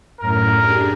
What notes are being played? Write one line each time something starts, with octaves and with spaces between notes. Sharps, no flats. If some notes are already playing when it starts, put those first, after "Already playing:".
F#2 A2 A#4
D4 G4 G#4